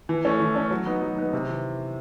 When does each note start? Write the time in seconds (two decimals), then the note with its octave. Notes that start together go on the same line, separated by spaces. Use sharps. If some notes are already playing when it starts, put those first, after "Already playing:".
0.09 E3
0.25 A3 C#4
0.40 E3
0.55 A3 C#4
0.71 F#3
0.86 B3 D#4
1.02 F#3
1.17 B3 D#4
1.33 C3
1.49 E3